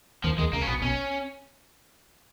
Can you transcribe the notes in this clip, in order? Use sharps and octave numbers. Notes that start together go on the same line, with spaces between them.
D#2 D#3 F3
D#2 D#3 G#3
C#2 C#3 A#3
C#4
B1 B2 B3
B1 B2 C#4